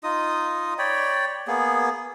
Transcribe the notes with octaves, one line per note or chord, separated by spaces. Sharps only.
D#4 F4 D#5 D#6
C#5 D5 G5 B5
A#3 B3 G#4